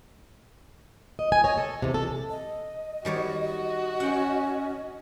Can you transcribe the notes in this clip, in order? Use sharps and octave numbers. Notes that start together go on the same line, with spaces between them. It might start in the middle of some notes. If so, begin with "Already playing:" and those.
D#5
G#5
C#5 D#5
A4
E2 C3
A4
D#5
D#3 G3 F#4 C#5
C#4 F#5 G5